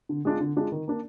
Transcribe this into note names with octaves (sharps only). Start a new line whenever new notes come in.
D3
G#3 D4 F4
D3
G#3 D4 F4
D#3
A#3 D4